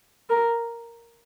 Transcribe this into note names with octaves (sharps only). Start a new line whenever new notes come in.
A#4